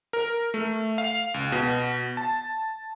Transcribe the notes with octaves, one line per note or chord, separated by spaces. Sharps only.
A#4
A3
F5
C#2
B2
A5